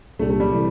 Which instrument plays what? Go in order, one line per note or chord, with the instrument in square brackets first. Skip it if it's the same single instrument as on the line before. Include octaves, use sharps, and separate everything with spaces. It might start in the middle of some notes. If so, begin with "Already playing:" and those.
[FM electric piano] C2 A#2 G3 D4 [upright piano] A3
[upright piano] A3
G3
[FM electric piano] C3 E3